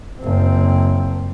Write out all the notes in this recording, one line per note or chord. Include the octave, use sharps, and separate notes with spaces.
F#1 C4